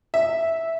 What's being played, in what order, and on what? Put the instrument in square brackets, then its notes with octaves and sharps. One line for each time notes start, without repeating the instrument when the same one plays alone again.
[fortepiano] E5